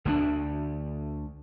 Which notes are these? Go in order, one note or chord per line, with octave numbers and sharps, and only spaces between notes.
D2 D3 F#3 D4